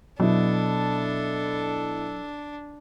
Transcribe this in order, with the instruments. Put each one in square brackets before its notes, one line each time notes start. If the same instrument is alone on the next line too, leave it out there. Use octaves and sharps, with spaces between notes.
[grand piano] B2 E4 [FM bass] F#3 [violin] D4 [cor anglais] A4